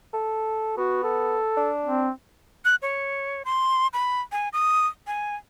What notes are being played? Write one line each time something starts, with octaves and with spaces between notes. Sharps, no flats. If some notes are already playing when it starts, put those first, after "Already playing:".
A4
B3 F#4
A4
D4
C4
F#6
C#5
C6
B5
G#5
D#6
G#5